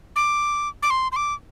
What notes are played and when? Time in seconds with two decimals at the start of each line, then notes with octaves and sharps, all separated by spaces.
0.16 D6
0.83 D6
0.90 C6
1.12 C6
1.16 D6